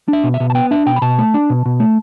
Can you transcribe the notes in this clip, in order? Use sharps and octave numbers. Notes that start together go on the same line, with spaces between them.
D4 E5
B2
E5
B2
A5
B3 G5
D4 E5
B2 G5
B5
B2 A5
A3
D4
B2
B2
A3